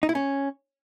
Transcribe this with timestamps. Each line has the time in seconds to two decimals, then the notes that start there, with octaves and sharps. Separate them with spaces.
0.03 D#4
0.09 E4
0.15 C#4